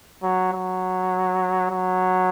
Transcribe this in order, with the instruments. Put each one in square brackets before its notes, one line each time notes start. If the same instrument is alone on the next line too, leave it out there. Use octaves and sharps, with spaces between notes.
[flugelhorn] F#3
F#3
F#3